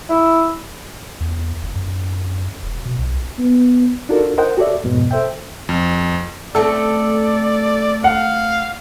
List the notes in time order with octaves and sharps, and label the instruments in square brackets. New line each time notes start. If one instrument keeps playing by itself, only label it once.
[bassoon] E4
[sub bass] E2
F#1
F#2
E1
B2
B1
[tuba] B3
[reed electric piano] D4 D#4 F4 F#4 A4 A#4
A#4 C5 D#5 F#5 G5
F#4 G4 A4 C#5 D5 E5
F2 G#2 B2
A4 C5 E5 G5
[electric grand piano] F2
[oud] A3 C4 C#4 [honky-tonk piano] A4 [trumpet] D5
[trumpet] F5 [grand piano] F#5